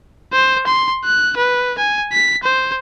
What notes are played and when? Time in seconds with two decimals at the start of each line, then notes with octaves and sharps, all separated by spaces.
0.32 C5
0.67 C6
1.05 F#6
1.37 B4
1.78 G#5
2.12 B6
2.43 C5